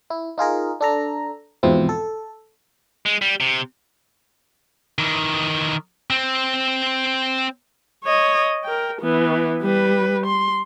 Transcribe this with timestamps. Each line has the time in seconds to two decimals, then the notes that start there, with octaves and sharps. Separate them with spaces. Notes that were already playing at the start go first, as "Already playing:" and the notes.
0.10 E4
0.38 D#4 F4 G#4 A#4
0.81 D4 A4 A#5
1.63 E2 G#2 B2 F3 C4 E4
1.89 A4
3.06 G#3
3.22 G3
3.40 C3
4.98 D#3 E3
6.10 C4
8.04 C#5 D#5
8.64 A#4 G5
9.01 E3 B3
9.62 G3 B4
10.26 C6